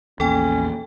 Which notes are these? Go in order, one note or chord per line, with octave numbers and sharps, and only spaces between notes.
A#1 E2 A#3 C#4 A4 G5